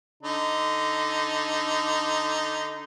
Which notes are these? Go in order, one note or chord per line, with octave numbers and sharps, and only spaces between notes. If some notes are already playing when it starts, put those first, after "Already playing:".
D3 D#4